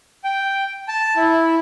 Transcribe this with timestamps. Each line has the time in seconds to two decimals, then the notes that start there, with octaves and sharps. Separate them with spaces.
0.24 G5
0.88 A5
1.16 E4